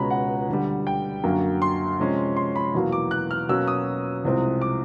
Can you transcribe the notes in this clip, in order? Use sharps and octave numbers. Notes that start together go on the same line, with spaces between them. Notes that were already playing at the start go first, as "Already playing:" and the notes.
Already playing: C#2 B2 G#3 C#4 A#5 B5
F#5
D2 D3 G3
G5
F#2 D3 F#3 A#3
C6
C3 F3 G#3 C#4
C6
B5
E2 B2 F#3 A#3
D6
F#6
F6
B2 F#3 A#3 C#4 E6
D#6
C2 C3 F3 G#3 C4
D6